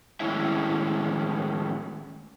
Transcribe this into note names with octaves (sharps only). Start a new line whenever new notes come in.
A2 D#3 G#3 C#4 E4 E5